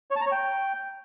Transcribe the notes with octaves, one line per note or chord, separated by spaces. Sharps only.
C#5
A5
A#5
C#5
G5